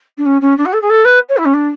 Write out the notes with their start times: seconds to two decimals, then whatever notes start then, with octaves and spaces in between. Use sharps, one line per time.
0.17 D4
0.25 C#4
0.41 C#4
0.57 D4
0.65 F#4
0.73 A4
0.81 G#4
0.89 A4
1.04 B4
1.29 C#5
1.37 E4
1.45 C#4
1.53 D4